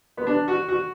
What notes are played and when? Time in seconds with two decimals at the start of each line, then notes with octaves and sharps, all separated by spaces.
0.17 B3
0.27 D4
0.48 F#4
0.68 F#4